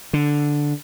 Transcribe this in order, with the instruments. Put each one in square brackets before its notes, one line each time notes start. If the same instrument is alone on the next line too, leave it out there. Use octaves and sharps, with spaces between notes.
[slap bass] D3